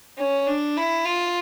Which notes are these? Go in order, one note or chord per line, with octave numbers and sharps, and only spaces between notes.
C#4
D4
E4
F4